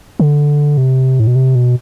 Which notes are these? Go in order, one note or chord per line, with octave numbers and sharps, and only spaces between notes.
D3
C3
A2
B2
C3
B2